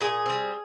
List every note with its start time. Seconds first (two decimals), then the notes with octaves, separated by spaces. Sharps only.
0.01 A#2 G#4
0.26 G3 C4